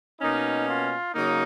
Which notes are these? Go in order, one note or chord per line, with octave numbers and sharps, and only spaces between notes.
B2 A#3 C#4 D#4
F4
C#3 F#3 A#3 D#4